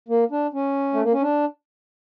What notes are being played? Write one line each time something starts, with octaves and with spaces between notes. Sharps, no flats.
A#3
D4
C#4
A3
A#3
C#4
D4